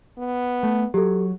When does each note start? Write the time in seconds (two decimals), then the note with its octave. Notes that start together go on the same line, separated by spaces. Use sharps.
0.18 B3
0.63 A3
0.94 F#3 G4 A4